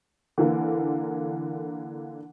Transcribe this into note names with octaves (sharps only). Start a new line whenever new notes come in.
D3 E3 A#3